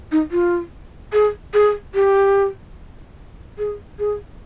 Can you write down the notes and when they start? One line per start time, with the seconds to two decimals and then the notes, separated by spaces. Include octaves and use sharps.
0.12 D#4
0.31 F4
1.13 G#4
1.54 G#4
1.95 G4
3.58 G#4
3.99 G#4